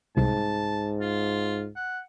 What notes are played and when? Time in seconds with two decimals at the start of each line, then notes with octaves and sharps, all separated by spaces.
0.17 C2 G#2 A5
1.01 F4
1.76 F#5